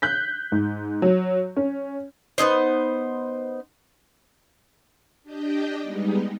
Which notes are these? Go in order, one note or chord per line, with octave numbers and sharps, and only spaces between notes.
F#6 G6 B6
G#2
F#3
C#4
B3 C#4 D#4 C5
D4 G4 D#5 G5
G3 G#3 B3 D#4